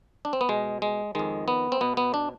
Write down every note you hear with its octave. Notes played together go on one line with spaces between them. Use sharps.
D4
C4
B3
B2 G#3
G#3
F2 D#3 G#3
B3
C4
B2 B3
B3
D4